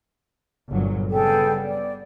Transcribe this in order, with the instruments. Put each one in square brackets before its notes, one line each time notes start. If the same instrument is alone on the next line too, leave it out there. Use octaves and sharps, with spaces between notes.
[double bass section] G1 A#2 F#3
[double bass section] C#3 G3 B3 [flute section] G#4 A4 G5
[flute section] D5